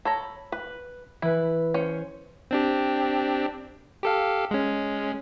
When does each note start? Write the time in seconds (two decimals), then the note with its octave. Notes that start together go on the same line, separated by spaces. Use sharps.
0.05 A4 C#5 A#5 B5
0.52 B4
1.22 E3 E4 B4
1.74 C#4 C5 C#5
2.51 C4 D4 G4
4.03 G4 A4 F5
4.51 G#3 C#4